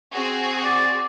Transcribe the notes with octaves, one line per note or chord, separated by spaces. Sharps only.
C4 F#4 G#4
D5